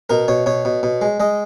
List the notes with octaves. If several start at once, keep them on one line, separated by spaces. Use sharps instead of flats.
B2 A#4
B2 C#5
B2 C#5
B2
B2
G#3
G#3 D#5